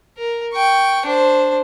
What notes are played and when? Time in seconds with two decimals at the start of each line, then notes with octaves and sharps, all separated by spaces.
0.17 A#4
0.53 G5 C#6
1.06 D4 C5